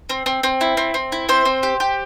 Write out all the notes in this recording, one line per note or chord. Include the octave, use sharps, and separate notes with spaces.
C4
C4
C4
E4
C4
C4
E4
C4 C5
C4
G4
G4